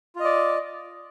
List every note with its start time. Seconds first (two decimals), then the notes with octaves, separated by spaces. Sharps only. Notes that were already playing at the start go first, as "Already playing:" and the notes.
0.16 F4
0.20 D#5
0.24 D5